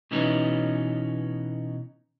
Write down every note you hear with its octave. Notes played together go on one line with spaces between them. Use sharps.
B2 E3 B3 C#4 D#4